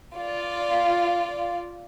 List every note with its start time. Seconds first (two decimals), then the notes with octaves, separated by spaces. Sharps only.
0.16 F4 D5